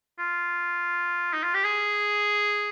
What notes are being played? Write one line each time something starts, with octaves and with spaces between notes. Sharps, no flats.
F4
D#4
F4
G4
G#4